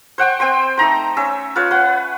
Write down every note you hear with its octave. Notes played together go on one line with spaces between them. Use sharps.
C5 F#5 G5 C#6
C4 G5 C6
A3 D#4 A#5 C6
C#4 E5
F4 B4 C#5
B4 F#5